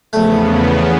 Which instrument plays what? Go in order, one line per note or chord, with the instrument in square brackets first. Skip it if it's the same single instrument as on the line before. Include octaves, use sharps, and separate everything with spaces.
[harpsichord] A#1 A3 [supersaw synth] E2 C#3 B3